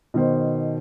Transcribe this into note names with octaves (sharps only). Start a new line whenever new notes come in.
B2 D#3 C5